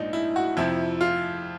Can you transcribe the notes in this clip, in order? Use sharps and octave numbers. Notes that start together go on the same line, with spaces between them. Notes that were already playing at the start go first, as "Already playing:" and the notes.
Already playing: A#1 G#2 F3 D4 D#4
E4
F#4
F2 C3 F3 E4
F4